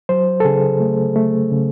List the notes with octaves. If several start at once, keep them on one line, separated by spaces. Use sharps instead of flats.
F#3 C5
A4
C#3 G#4
A3
A3
C#3